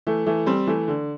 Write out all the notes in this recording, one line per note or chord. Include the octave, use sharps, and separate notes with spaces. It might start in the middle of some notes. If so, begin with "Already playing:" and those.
E3 A3
E3 A3
G3 C4
E3 A3
D3